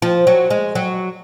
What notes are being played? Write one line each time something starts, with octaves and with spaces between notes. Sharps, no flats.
F3
F#3
G#3
F#3